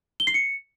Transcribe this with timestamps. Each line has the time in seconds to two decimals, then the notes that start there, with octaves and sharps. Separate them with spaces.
0.20 G7
0.27 C7
0.34 C#7